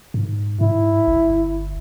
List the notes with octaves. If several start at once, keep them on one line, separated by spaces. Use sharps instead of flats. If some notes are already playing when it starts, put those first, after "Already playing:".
G#2
G#2 E4
G1